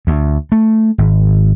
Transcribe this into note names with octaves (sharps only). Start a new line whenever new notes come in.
D2
A3
G#1